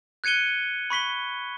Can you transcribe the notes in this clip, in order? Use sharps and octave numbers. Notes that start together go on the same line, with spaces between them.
F#6 G#6 C#7 D#7 G7
B5 C#6 B6 G7